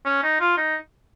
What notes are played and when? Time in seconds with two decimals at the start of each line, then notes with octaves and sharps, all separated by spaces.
0.05 C#4
0.23 D#4
0.40 F4
0.57 D#4